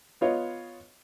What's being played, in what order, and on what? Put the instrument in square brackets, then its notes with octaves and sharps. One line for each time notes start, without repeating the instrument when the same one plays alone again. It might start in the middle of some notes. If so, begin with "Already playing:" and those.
[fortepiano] B3 F4 C#5 D#5